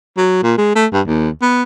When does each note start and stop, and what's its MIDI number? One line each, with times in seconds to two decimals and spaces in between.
0.17 0.42 54
0.43 0.55 46
0.58 0.74 56
0.75 0.86 57
0.93 1.01 43
1.06 1.29 39
1.42 1.63 59